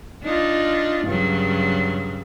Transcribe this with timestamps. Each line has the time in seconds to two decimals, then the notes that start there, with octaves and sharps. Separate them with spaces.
0.23 D4 D#4 F4
1.04 G2 C#3 F#3